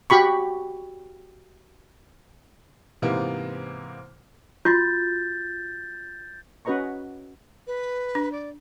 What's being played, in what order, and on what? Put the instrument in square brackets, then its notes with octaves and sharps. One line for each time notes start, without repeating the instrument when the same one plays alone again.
[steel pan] F#4 G4 B5 C#6
[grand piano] G#2 C3 E3 A#3 B3
[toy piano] F4 F#4 C6 [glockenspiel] G6 A6
[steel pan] C#4 F#4 B4 D#5 A#5 C#6
[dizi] B4
[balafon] D4
[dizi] D5